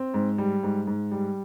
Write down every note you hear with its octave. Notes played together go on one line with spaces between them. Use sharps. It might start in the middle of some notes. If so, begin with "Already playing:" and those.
Already playing: C4
G#2
G3
G#2
G#2
G3